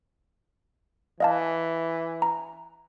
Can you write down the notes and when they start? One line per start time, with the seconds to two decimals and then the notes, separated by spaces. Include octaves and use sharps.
1.20 E3 D#5 F5 A5
2.22 A#5